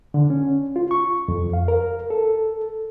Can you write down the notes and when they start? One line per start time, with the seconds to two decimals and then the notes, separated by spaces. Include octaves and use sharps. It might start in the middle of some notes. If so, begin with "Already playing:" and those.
0.14 D3
0.30 C#4
0.76 F4
0.91 C#6
1.28 F2
1.53 F5
1.68 A#4
2.10 A4